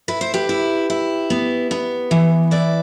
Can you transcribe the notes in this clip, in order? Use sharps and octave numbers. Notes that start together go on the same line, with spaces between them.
E4 B4
C5
G4 B4
E4
E4
B3
B3
E3
E4 B4 D5